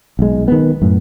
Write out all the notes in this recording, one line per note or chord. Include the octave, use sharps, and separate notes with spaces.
B1 G#3
D#3 B3
F#2 A2